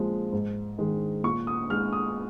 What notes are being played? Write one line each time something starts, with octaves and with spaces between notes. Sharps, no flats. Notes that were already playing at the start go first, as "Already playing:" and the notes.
Already playing: A#2 F3 G#3
G#2
D#3 G#3
A#2 C#6
D#6
G#3 F6
D#6